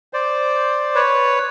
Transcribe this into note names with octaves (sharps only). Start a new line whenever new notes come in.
C5 D5
B4 C#5